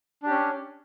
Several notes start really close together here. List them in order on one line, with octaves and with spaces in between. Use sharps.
D4 G4 C#4